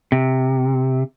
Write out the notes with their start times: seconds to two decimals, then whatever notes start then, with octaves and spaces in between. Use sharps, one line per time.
0.12 C3